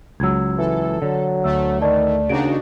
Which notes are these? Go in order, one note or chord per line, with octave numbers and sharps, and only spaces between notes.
C#2 F#3 E6 G#6
E3 A4
D3 F#3
D2 A3 E6
D#3 D5 A5
D#2 C#3 D4 D#4 F#4 D7